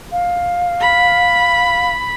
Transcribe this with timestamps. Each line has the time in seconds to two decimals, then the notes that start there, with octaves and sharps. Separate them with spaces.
0.12 F5
0.81 B5